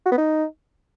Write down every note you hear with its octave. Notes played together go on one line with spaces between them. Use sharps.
F#4
B3
D#4